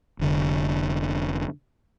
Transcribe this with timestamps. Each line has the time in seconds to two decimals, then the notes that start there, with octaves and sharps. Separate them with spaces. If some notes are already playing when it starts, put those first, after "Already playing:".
0.19 F1 D3